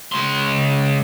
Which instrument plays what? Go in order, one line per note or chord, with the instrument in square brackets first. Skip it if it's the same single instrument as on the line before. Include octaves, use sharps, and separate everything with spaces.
[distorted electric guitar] C#2 C6